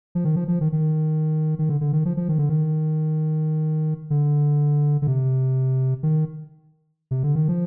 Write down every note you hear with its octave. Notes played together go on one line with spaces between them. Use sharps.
F3
D#3
F3
F3
D#3
D#3
D#3
D3
D3
D#3
F3
F3
D#3
D3
D#3
D3
D3
C3
D#3
C3
D3
D#3
F3